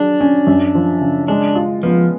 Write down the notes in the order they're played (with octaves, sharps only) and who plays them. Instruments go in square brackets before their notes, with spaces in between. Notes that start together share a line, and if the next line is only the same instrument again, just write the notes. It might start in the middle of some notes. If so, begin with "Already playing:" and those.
Already playing: [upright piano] F#3 G#4 [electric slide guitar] D4
[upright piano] C#4
F#2
F3
C#3
[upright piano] G#3 [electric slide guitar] D4
[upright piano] F4
[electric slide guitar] F3 [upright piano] B3